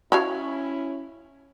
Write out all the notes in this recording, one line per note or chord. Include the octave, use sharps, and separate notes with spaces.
C#4 E4 F#4 C#5 F5